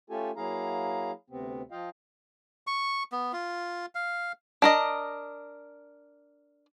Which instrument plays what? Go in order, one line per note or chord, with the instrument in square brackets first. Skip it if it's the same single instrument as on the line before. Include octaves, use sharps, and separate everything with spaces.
[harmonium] A3 C#4 F4 G4 A4 G#5
F#3 A#3 E4 G#4 F5 A#5
D2 C3 B3 C4
F3 F4 D#5 F5 G5
[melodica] C#6
B3
F4
F5
[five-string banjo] D4 A#4 D#5